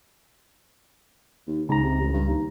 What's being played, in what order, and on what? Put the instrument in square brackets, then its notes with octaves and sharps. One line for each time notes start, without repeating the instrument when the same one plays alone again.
[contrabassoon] D#2
[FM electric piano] C#2 A#5 [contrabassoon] G#2
[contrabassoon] C3
A1
G2
D#2